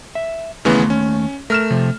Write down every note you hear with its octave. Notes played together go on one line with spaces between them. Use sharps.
E5
D#2 C#3 E3 A3 B3 C6
C#4
A3 A#4 F6 E7
C3 F3